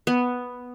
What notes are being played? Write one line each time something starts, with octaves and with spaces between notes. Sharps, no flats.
B3